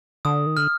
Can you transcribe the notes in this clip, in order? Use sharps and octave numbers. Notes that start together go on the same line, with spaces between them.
D3 D#6
D#3
D3 F6